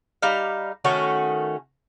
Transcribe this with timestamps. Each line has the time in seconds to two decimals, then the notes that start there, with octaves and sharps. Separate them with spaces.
0.22 G3 D#4 F5
0.84 D#3 A3 C#4 F#4